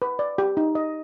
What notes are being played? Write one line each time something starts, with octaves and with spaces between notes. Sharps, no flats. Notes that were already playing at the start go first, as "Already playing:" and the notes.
B4
D5
G4
D#4
D#5